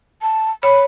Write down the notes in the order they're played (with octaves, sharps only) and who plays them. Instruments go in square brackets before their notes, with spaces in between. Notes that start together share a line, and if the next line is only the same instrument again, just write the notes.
[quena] A5
[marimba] C#5 [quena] B5